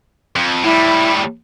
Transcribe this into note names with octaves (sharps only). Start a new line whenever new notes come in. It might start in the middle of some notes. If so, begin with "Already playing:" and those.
F2
A2 G3 E4